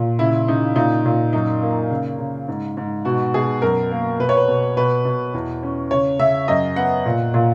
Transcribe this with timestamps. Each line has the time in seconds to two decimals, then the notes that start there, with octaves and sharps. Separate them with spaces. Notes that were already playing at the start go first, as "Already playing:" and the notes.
Already playing: A#2
0.19 C#3 E4
0.48 C#3 D#4
0.76 A#2 D#4
1.05 A#2
1.33 F#2 D#4
1.62 A#3
1.90 C#3
2.19 C#3
2.48 G#2
2.77 G#2
3.05 B2 F#4
3.34 B2 G#4
3.62 F#2 A#4
3.91 A#3
4.19 B2 B4
4.29 C#5
4.37 B4
4.48 B2
4.77 B2 B4
5.05 B2
5.34 E2
5.63 C#4
5.91 C#3 C#5
6.19 C#3 E5
6.48 F#2 D#5
6.76 B3 F#5
7.06 A#2
7.34 A#2